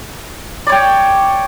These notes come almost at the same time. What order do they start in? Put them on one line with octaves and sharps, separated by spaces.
D5 C#5 G5